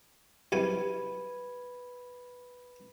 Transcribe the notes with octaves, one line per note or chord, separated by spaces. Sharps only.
C2 F#2 B4 G#5 B5 G#6